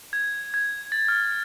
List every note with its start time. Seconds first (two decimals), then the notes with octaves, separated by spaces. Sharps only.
0.13 G#6
0.54 G#6
0.92 A6
1.08 F6